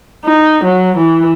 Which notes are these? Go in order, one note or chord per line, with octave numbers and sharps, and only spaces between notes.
D#4
F#3
E3